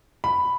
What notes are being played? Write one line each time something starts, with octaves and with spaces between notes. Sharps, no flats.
B5